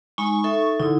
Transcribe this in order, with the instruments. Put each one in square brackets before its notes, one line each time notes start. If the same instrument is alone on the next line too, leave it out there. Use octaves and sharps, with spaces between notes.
[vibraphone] G#3 D#4 B5 [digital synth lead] C#6
[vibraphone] D#4 A4 E5
[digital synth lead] D3 [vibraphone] D#4 E4